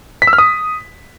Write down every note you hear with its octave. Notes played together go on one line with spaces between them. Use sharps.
B6
E6
F6
D#6